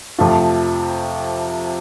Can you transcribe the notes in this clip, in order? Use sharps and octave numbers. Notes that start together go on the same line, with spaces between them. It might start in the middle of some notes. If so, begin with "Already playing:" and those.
F2 C3 F3 A3 F4